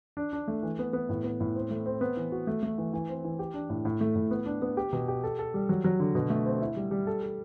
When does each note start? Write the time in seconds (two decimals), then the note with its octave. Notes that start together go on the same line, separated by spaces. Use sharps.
0.17 D4
0.33 D4
0.48 A3
0.63 E3
0.79 B3
0.93 B3
1.09 A2
1.24 B3
1.40 A2
1.56 C4
1.71 A3
1.86 C4
2.01 B3
2.17 E3
2.32 F#4
2.47 A3
2.63 A3
2.78 E3
2.93 E3
3.09 C4
3.24 E3
3.39 G4
3.54 D4
3.70 A2
3.85 A2
4.01 A3
4.16 A2
4.31 B3
4.46 D4
4.62 B3
4.77 G4
4.93 B2
5.08 G4
5.24 A4
5.39 A4
5.54 G3
5.69 F#3
5.84 F#3
6.00 D3
6.15 B2
6.30 A3
6.46 C4
6.62 E4
6.76 G3
6.91 G3
7.07 A4
7.23 A4